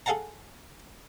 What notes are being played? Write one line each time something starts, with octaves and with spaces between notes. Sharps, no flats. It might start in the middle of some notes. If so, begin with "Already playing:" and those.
G#4 A4 F5 F#5 A5 A#5